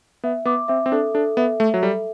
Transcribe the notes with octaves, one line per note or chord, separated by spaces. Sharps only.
B3 E5
B3 D6
C4 E5
C4
D4 A4
D4 A4
B3 E5
A3 E5
F#3
G3 A4